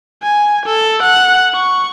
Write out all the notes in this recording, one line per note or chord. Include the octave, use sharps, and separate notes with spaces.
G#5
A4
F#5
C#6